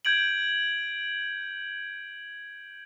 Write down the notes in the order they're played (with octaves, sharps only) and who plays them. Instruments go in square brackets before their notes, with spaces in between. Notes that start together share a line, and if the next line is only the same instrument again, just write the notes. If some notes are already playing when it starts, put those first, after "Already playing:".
[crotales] G6 G#6 D7 F#7